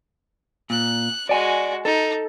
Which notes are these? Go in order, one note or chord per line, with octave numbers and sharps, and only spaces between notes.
A#2 F#6
G#3 F#4 D5 G#5
D#4 A4